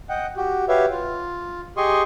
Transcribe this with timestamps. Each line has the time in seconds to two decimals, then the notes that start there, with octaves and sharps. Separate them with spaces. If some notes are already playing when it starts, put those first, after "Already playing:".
0.09 D#5 F#5 G5
0.37 F#4 G4
0.68 F#4 G4 B4 C#5 E5 F5
0.91 F4
1.77 G4 G#4 D#5 C6 C#6 D#6